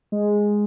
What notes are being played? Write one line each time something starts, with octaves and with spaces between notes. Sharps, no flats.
G#3